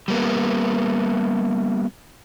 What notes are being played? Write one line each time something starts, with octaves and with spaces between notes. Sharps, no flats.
G3 A#3 B3